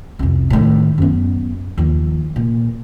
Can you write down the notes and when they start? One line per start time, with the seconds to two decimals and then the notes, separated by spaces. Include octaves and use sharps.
0.19 C2 F2
0.50 A2 D#3
0.98 F#2 B3
1.78 D#2 F3
2.36 A#2